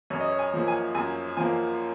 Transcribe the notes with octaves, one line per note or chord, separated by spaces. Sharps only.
F#2 C#5
D#5
C#5
G#5
F3 A#3
G#5
F#2 G#5
F3 A#3 G#5